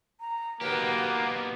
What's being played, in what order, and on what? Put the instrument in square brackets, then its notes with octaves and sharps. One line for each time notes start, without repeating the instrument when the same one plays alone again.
[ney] A#5
[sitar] B2 D#3 F#3 [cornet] A#3 [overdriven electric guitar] B3 G4 [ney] B4